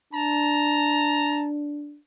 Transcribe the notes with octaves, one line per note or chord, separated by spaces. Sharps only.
D4 A5 A#5